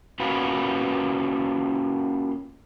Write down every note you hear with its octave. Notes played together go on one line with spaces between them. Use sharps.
A#3 C#4 F4 F#4 B4